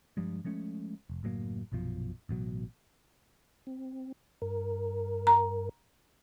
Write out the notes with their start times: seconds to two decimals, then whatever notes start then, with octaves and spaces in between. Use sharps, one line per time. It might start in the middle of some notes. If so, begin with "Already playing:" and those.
0.17 G2 F3 G3 G#3
0.45 F3 G#3 A3 C#4
1.10 F1
1.23 F#1 A2 F#3 A#3
1.72 A#1 F#2 B2 F3
2.29 A1 B2 F#3
3.67 C4
4.42 G2 A#4
5.27 A#5